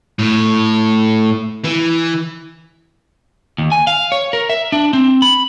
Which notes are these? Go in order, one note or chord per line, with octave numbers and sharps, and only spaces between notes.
A2
E3
D#2
G#5
F5
C#5
A#4
E5
D4
C4
B5